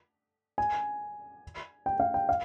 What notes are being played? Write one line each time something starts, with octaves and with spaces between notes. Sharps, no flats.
G#5
G5
F5
G5
F5